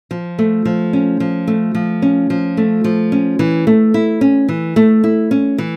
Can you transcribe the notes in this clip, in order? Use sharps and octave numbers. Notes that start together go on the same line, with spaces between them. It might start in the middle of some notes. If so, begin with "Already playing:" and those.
F3
A3
F3
C#4
F3
A3
F3
C#4
F3
A3
F3
C#4
E3
A3
E4
C#4
E3
A3
E4
C#4
E3